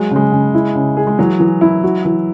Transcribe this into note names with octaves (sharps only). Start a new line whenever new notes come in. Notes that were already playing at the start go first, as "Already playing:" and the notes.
Already playing: F#3 G#3
C#3 G#3
C#3
E4
C#3
G#4
G#3
E3 F#3
E3
E4
F#4
E3